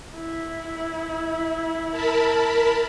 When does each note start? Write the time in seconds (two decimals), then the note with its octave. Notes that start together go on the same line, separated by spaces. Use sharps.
0.15 E4
1.91 A#4 A5 B5